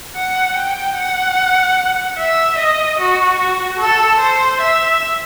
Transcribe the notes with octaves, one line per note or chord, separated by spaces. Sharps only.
F#5
G5
F#5
E5
D#5
F#4
F#4
A4
C5
E5